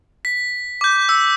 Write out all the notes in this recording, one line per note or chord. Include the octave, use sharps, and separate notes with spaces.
B6
D6 G6
E6